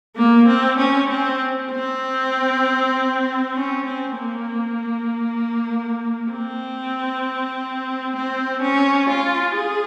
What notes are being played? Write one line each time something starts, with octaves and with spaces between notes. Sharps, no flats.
A#3
C4
C#4
C4
C4
C#4
C4
A#3
C4
C4
C#4
F4
G#4